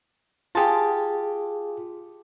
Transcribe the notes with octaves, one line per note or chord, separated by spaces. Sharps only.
F4 G4 G#4 G#5 A5